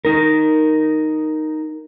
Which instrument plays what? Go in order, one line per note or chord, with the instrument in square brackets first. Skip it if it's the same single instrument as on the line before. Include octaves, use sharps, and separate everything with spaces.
[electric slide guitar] D#4 A#4